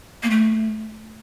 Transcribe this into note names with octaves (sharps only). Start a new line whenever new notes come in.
A#3
A3